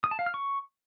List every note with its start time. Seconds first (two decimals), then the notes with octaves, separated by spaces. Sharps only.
0.04 D#6
0.11 A5
0.19 F5
0.26 F6
0.34 C#6